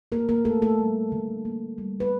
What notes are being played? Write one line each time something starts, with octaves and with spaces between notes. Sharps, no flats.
A3 A#3 A#4
A#3 A#4
D3 A3 A4
A3 A4
G3
D3
A#3
G3
B4